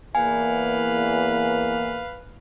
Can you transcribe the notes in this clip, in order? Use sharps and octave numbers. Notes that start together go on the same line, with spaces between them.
E2 A#3 B4 F5 G#5